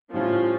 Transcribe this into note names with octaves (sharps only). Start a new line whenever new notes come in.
A2 F3 G3 C#4